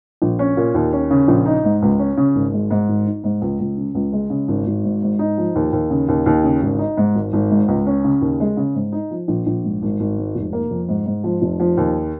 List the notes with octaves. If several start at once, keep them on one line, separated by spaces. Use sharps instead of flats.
A#1
C#4
A#2
D#2
C#4
C#3
A#1
D#4
G#2
C#2
C#4
C#3
G#1
G#3
G#2
G#1
D#4
G#2
C#2
C#2
C#3
C#2
G#3
C#3
G#1
G#1
G#2
G#2
D#4
F3
D#2
D#2
C#3
D#2
D#2
C#3
G#1
D#4
G#2
G#1
G#1
G#2
C#2
C#4
C#3
D#2
G#3
C#3
G#2
D#4
F3
A#1
A#1
G#2
G#1
G#1
G#2
F1
A#3
F2
G#2
G#2
F3
F1
F3
D#2